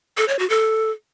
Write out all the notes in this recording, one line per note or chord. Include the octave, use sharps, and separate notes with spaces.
A4
C#5
F#4
A4